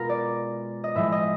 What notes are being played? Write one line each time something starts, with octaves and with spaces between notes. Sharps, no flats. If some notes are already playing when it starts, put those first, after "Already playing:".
Already playing: B2 G#3 F4 A#4
D5
D#5
A2 F3 G#3 E5
D#5